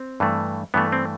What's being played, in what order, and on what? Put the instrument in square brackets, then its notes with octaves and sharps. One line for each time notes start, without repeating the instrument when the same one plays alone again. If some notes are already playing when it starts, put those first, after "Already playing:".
Already playing: [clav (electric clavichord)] C4
G2 E3 A3
G2 E3 A3 B3
C4